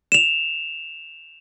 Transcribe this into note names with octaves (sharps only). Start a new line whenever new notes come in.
E7 F7